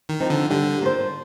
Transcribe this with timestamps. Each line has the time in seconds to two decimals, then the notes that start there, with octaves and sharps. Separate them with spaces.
0.09 D#3
0.20 F3 C4 D#4
0.30 D3
0.50 D3 G3
0.81 A#3 F4 C5